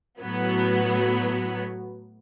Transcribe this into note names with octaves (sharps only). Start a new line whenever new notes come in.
A2 F#3 B3